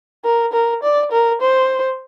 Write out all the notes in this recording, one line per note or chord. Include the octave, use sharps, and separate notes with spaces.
A#4
A#4
D5
A#4
C5